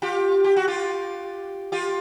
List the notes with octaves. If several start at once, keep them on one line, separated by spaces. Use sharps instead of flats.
F4 G4
G4
F#4
F4 G4
F4 G4